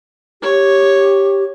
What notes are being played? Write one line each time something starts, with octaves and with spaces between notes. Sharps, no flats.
G4 C#5